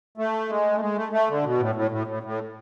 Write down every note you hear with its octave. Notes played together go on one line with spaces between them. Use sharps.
A3
G#3
A3
G#3
A3
A3
D3
B2
A2
A2
A2
A2
A2